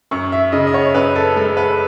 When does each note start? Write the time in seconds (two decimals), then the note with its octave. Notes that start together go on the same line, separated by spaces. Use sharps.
0.11 F#2 C#6
0.32 E5
0.52 C#3 D#5
0.67 D#5
0.74 C#5
0.94 F#2 B4
1.16 A4
1.36 G#3 A4
1.57 B4